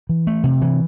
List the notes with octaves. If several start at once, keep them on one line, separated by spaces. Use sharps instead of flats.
E3
A3
C3
E3